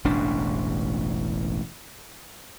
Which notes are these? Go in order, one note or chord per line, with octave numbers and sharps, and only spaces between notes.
E1 A1 G2 D4